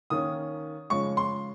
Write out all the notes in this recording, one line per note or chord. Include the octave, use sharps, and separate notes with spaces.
D#3 A#3 C#4 D#6
C#3 F3 G#3 C#4 C#6
C6